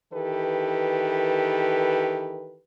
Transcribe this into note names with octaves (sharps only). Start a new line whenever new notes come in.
D#3 E3 G4 A4 B4